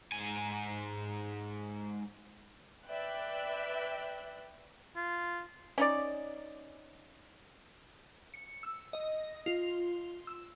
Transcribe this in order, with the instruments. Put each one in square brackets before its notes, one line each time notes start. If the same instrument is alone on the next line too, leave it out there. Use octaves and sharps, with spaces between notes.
[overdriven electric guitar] G#2 G#5
[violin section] B4 D5 E5 G5 F#6
[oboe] F4
[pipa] C#4 D#4 D5
[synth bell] C#7
E6
D#5
F4
E6